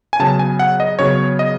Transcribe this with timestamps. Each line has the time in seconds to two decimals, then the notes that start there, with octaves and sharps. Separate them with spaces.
0.13 G#5
0.19 C#3 F#3 B3 A5
0.39 G#5
0.59 F#5
0.80 D#5
0.99 C#3 F#3 B3 C#5
1.39 D#5